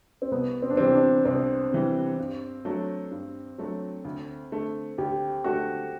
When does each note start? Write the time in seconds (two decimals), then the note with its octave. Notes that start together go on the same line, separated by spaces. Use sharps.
0.22 C4
0.31 C2 B3
0.62 C4
0.70 D4
0.77 C3 E3 G3 C4
0.94 D4
1.25 C2 C4
1.72 C3 E3 G3
2.19 G2
2.65 F#3 A3 D4 F#4
3.11 G2
3.58 F#3 A3 D4 F#4
4.05 D2
4.52 D3 A3
4.98 D2 G4
5.44 D3 A3 F#4